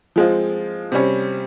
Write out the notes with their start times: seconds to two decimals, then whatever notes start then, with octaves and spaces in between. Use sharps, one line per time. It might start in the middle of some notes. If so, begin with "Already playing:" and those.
0.16 F3 G#3 C4 F4
0.92 C3 G3 C#4